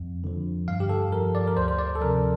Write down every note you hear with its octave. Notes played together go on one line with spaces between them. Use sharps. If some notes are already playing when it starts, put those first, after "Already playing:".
Already playing: F2
D3 F3
G2 F5
G4
A4
F3 A#4
D5
A#4
D2 C5
C5
D5
A4
C3 F3 A#4